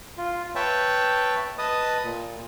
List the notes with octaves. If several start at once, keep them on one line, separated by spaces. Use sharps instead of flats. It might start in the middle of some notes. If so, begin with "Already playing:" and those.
F4
B4 C#5 E5 G5 A5
B4 D#5 A5 D#6
A#2